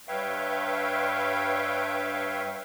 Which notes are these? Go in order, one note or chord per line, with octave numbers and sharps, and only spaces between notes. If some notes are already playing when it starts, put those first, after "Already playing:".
G2 B4 C#5 E5 F5 G5